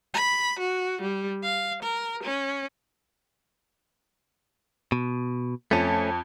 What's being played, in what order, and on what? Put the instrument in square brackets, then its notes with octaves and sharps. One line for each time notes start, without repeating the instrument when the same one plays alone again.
[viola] B5
F#4
G3
F5
A#4
C#4
[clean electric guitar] B2
[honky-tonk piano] F2 [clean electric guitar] A3 C#4